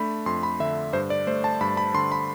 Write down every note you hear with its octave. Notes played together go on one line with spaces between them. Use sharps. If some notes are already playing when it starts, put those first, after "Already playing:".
Already playing: A3 D4 B5
F2 C6
B5
D3 E5
G2 C5
D5
A3 C5
A5
G2 B5
B5
D3 C6
B5